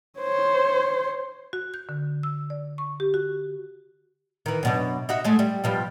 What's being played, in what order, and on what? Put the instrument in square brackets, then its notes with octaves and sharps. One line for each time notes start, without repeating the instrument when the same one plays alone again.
[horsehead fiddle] C5 C#5
[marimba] F#4
G6
D3
E6
D5
C#6
G4
F#4
[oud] D#3 E3
F#2 B2 D4
D#4 F#4 E5
G#3 A3
G3
B2 F3 G3